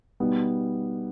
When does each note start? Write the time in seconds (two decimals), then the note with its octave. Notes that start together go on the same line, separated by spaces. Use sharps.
0.20 B2 G3 B3 D#4